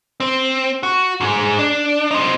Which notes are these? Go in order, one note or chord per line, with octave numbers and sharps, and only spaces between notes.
C4
F#4
G#2 G#3
D4
C4 D#4